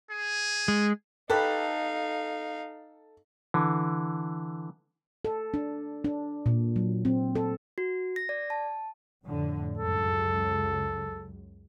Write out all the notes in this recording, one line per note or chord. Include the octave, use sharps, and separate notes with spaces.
G#4
G#3
D#4 G4 A4 B4 F5
D3 E3
A4
D4
D4
A#2
F#3
C4
A4
F#4
A#6
D5
A5
F2 A2 D3
C#2 F#2 A4